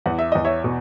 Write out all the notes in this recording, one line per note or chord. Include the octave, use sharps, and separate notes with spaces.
E2 F#5
E5
E2 D#5
C#5 E5
B2